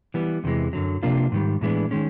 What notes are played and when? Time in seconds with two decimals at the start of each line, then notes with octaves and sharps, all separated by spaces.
0.14 E3 G3 B3
0.44 E2 C3 E3 G#3
0.73 F#2 D3 F#3
1.03 C3 F3 A#3 D4 F4
1.32 G#2 D#3 G3
1.61 A2 E3 G#3 B3 D4
1.91 D#3 G#3 C#4